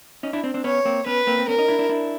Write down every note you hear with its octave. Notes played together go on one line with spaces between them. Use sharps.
C#4 D#4
D4 E4
C4 D4
C4 D4
B3 C#4 C#5
A#3 C4
B3 C#4 B4
A#3 C4
C4
B3 C#4 A#4
C#4 D#4
D4 E4
D4 E4
D4 E4